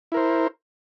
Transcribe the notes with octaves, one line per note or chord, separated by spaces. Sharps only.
E4 A#4 C5